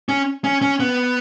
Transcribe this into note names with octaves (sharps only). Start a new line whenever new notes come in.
C#4
C#4
C#4
B3